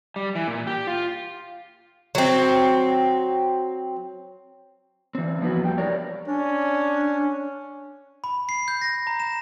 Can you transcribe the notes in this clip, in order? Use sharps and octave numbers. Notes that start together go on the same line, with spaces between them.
G3
E3
A#2
G4
F4
F#3 C4
E3 C4
F3 A#3 B3 E4 F#4
F2 G3 E4 G5
E4 G4 A#4 C#5 D5
C#4 D4
B5
C7
G6
A#6
A#5
E7